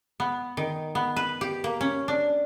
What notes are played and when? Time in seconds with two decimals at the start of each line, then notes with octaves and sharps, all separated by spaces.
0.20 B3
0.57 D#3
0.95 B3
1.16 B4
1.41 G4
1.64 A#3
1.81 C#4
2.08 D4